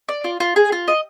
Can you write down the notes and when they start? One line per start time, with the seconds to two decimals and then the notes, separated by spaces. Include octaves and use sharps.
0.09 D5
0.24 F4
0.40 F4
0.56 G#4
0.72 F4
0.88 D#5